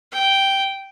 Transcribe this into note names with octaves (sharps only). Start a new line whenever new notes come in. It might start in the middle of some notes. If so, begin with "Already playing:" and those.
G5